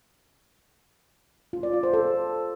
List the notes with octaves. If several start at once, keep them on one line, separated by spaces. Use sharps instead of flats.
F4
D5
F4
C5
A4